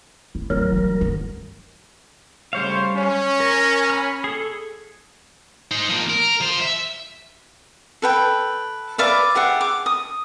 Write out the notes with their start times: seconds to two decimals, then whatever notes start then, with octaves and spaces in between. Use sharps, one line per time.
0.35 E4
0.50 D1 E3 F#3 A#4
0.72 E3 G3
1.01 D#3
2.53 C#3 G3 A3 C5 C#5 F5
2.95 C#4
3.40 A#4
3.90 B5 F6
4.24 G#4 A4
5.71 D#4 C5
5.89 F3 A#3
6.10 A#4
6.41 F3 C5
6.62 E5
8.02 A4 B4 G5
8.98 B4 D5 E5 F5
9.35 G4 G#4 E5 F#5
9.61 D6
9.86 D#6